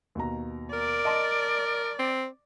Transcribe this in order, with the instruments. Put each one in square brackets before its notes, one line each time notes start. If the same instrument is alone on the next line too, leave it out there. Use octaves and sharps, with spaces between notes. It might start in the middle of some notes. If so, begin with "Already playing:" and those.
[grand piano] D#2 B2 A#5
[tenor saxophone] A#4 [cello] D5
[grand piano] D#5 A5 C6
[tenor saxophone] C4